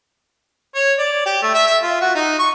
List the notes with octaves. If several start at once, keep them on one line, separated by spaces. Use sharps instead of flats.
C#5
D5
G4
A3
E5
E5
F4
F#4
D#4
C#6